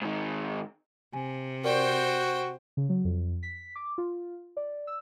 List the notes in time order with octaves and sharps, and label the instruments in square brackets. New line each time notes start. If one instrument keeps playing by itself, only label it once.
[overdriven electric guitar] G#2 D#3
[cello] C3 [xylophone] G#5
[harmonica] F#4 [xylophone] A#4 D5 C#6 [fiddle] C5 G5
[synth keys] C#3
F#3
F2
B6
D6
F4
D5
E6